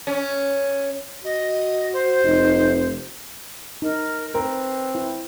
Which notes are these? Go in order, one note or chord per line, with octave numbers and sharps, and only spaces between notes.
C#4
F#4 D#5
C5
F1 D#4
D#4 A#4
C4 A#4 B4
E4